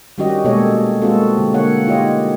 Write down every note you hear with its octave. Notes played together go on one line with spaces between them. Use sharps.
D#3 G3 C#4 F#4 G4 D#5
B2 G#3 A#3 A4 C#5 D#5
G#3 A#3 C4 F4 F#4 A4
D3
A#3 C#5 F#5
D#4 F4 G4 C#5 D#5